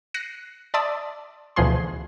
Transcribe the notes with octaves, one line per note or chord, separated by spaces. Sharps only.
F#6 A#6 C7 C#7 D#7
D5 E5 A5 C6 D#6 E6
D2 B2 E3 F3 G#4 C6